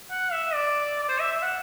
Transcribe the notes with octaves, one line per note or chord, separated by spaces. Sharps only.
F#5
E5
D5
D5
C5
E5
E5
F#5